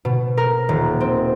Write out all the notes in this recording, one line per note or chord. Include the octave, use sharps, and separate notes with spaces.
B2
A#4
D#1
C4